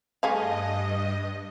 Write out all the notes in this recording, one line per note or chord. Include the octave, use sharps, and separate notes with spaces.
G2 A3 G#4 D#5 F5